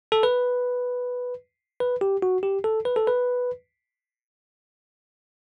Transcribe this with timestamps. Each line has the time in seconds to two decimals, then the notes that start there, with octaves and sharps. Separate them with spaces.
0.12 A4
0.23 B4
1.80 B4
2.01 G4
2.22 F#4
2.43 G4
2.64 A4
2.85 B4
2.96 A4
3.07 B4